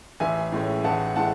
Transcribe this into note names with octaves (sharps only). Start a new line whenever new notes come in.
A1 E5 G#5
A2 G#3 C#4
A1 F#5 A5
A2 G#3 F#5 A5